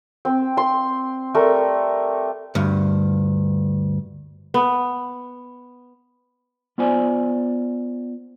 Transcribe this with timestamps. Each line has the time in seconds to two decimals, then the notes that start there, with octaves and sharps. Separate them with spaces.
0.25 C4
0.57 C6
1.34 G3 A3 A#4
2.55 D2 G2
4.54 B3
6.78 B3 F4 C5 D5 G#5